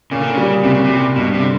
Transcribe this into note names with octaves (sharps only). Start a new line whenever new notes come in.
A#2 C#3
D3
C#3
G3
C2 C3
C#3
C3
G3
G2 B2
C3
D3